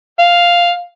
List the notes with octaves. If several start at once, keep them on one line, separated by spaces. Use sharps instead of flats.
F5